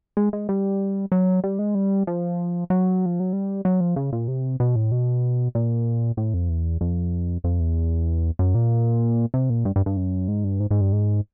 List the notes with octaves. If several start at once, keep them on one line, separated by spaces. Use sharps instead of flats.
G#3
G#3
G3
F#3
G3
G#3
G3
F3
F#3
F3
F#3
G3
F#3
F3
C#3
A#2
C3
B2
A2
B2
A#2
A2
F2
E2
F2
F2
E2
F#2
A#2
C3
A#2
G2
G2
G2
F#2
G#2
G2
G#2
G#2
G2
G#2